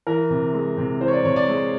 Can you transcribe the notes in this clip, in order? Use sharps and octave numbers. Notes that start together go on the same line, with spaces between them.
E3 A#4
C3
G#3
C3
E3 C5
C#5
D5
C3 C#5
D5
G#3